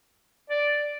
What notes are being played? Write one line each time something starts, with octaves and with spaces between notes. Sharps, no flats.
D5